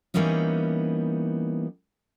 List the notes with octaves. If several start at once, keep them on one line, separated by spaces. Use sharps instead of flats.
E3 G3 A#3 B3 C#4 D#4